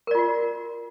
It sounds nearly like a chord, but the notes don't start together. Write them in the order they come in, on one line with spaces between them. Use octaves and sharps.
A#4 D5 F4 F#4